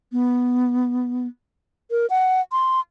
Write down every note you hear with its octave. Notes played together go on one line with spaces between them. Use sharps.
B3
A#4
F#5
C6